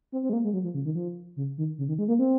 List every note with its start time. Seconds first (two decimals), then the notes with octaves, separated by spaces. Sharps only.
0.12 C4
0.23 C4
0.30 G#3
0.33 A#3
0.44 G#3
0.53 F#3
0.64 F3
0.74 C#3
0.85 D#3
0.95 F3
1.37 C#3
1.58 D#3
1.78 C#3
1.88 D#3
1.99 G#3
2.08 A#3
2.19 C4